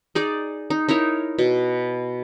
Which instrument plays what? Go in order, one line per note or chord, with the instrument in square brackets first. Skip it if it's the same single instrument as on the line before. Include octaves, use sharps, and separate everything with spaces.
[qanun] D#4 G#4 D5
D#4
D#4 E4 A#4 C#5
B2